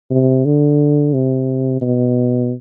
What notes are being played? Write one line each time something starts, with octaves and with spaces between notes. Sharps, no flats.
C3
D3
C3
B2